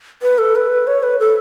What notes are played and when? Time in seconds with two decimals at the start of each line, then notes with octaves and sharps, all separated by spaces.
0.22 B4
0.38 A4
0.55 B4
0.87 C#5
1.03 B4
1.19 A4